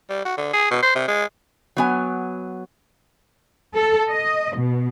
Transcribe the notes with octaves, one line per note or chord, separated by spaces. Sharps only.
G3
F#4
D3
G#4
B2
C5
C3
G#3
F#3 B3 G#5
A4
D#5
B2